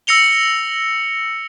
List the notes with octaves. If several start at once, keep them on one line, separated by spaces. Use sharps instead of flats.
E6 A#6 C#7 F7 G7